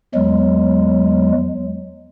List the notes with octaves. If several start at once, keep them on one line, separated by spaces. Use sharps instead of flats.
E2 F#3 G#3